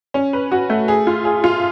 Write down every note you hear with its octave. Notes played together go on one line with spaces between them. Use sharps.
C#4
B4
F#4
A3
G#4
F4
G#4
F4